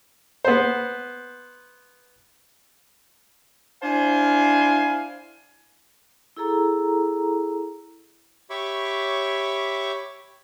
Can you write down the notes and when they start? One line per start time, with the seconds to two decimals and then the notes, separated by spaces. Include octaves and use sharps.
0.44 B3 C5
3.83 D4 E4 C5 F5 G#5
6.37 E4 G#4 A4 A#5
8.50 G4 C#5 E5 B5 C#6 D6